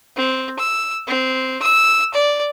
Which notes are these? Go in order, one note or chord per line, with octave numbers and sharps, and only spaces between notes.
C4
E6
C4
E6
D5